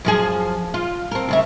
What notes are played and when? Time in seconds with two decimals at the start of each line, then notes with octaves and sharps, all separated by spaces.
0.05 F#2 F3 G#4
0.74 F4
1.12 C4 A#4
1.29 D2 C#3 E5